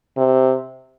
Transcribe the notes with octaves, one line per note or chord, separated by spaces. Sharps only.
C3